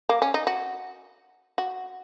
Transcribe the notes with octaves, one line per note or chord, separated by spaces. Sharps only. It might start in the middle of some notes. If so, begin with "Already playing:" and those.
A#3
C#4
D#4
F#4
F#4